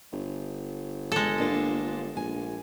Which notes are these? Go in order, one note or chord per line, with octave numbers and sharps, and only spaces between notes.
G1
G#3 A4
A#3 D4 F4
A#1 G#5